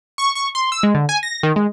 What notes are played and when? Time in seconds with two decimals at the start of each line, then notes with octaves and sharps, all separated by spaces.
0.18 C#6
0.35 C#6
0.55 C6
0.72 E6
0.83 G#3
0.95 D3
1.09 G#5
1.23 A#6
1.43 D#3
1.56 G#3